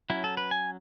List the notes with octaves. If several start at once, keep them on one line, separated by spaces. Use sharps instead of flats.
F#3 C#4 E4
A4
B4
G#5